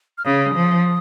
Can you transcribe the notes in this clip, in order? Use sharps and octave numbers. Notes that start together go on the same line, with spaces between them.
F6
C#3 D#6
F3